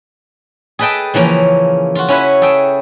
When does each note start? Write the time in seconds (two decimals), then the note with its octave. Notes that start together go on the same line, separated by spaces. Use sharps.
0.79 G#4 A4 B4 D#5 G5 A5
1.14 C#3 E3 F3 A#3 C#4
1.95 F4 F#4
2.09 C#4 E4 B4 C#5
2.42 G#4 A4 E5 G5